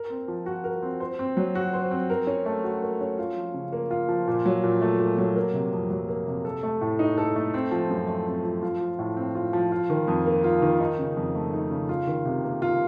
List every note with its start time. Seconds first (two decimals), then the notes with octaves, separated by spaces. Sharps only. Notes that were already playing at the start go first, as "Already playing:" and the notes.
Already playing: A#4
0.10 C4
0.28 F3
0.46 F#4
0.64 A#4
0.83 C4
1.00 C5
1.19 C4
1.37 F#3
1.55 F#4
1.73 C5
1.91 C4
2.10 A#4
2.27 C#4
2.46 A3
2.64 F#4
2.82 A#4
3.01 C#4
3.18 F4
3.37 F3
3.54 C#3
3.72 A#3
3.91 F4
4.08 F3
4.28 A#2
4.46 F#3
4.63 A#2
4.82 A3
4.99 A#2
5.18 F#3
5.36 A#3
5.54 C3
5.73 F2
5.90 F#3
6.08 A#3
6.26 C3
6.45 A4
6.63 A3
6.81 A2
6.99 D#4
7.18 A4
7.36 A3
7.54 C4
7.71 F3
7.90 F#2
8.08 A3
8.26 C4
8.45 F3
8.63 F4
8.81 F3
8.99 A2
9.17 C4
9.35 F4
9.53 F3
9.72 F4
9.90 D#3
10.08 F2
10.26 A#3
10.44 F4
10.62 D#3
10.80 D#4
10.99 C#3
11.17 F2
11.35 A3
11.53 D#4
11.71 C#3
11.89 F4
12.07 D#3
12.25 C3
12.44 A#3
12.62 F4